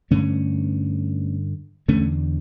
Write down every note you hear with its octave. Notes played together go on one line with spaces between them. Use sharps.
G2 D3 A3 C#4
E2 D3 A3 C#4